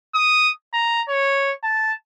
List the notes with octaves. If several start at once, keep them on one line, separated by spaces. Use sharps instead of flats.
D#6
A#5
C#5
A5